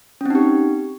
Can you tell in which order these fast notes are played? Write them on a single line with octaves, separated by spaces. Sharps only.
C#4 C4 D#4 G4